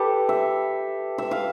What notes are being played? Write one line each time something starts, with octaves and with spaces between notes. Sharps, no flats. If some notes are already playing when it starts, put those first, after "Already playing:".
Already playing: G4 A4 B4
E5
E5
F5